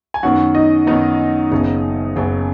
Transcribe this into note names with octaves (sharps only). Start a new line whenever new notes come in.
G#5
F#2 D#3 B3 F#4 F#5
D#4 D#5
F#2 D#3 B3 D#4 D#5
F#1 F#2 C#3 B3
F#1 F#2 C#3 B3